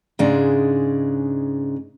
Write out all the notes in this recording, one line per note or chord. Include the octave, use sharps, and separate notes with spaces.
G#2 C#3 G#3 D4